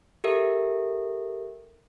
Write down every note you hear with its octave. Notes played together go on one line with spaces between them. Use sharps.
G4 A4 A#4 E5